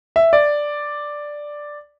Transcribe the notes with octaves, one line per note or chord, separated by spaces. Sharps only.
E5
D5